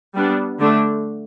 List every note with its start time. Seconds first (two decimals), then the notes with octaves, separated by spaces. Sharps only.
0.15 G3 B3 D4
0.59 D3 A3 D4